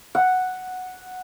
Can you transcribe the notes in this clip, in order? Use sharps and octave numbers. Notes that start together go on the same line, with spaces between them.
F#5